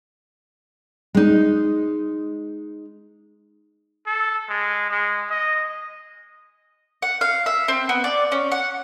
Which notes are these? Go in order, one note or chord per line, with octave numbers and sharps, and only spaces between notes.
G#3 D#4
A4
G#3
G#3
D#5
F#5
F5
E5
C4
B3
D5
C#4
F#5